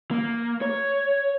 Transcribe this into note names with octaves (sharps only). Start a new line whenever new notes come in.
A#3
C#5